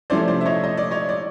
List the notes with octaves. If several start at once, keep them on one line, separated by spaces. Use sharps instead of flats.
C3 F3 A3 C#4 E4 C5 D5
C5 D5
E5
C#5 D#5
D#5
D5
C#5 D#5
D5